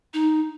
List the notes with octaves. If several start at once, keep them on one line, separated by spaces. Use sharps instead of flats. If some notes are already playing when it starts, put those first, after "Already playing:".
D#4